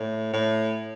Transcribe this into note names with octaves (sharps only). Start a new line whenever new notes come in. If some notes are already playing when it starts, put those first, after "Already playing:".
Already playing: A2
A2